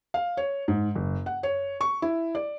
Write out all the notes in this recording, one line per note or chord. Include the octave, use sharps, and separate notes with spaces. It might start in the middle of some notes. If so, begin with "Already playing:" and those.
F5
C#5
G#2
F#1
F#5
C#5
C#6
E4
D5